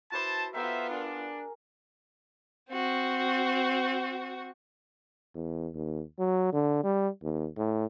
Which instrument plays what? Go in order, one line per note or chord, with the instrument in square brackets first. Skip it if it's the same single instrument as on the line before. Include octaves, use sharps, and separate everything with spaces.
[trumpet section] E4 C5 A5 [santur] F#4 B4 D6
[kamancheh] B3 F4 [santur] A4 G5 A#5 [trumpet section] C5 E5
[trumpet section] D4 [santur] G#4 A#4
[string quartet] C4 F#4
[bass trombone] E2
D#2
F#3
D3
G3
D#2
A2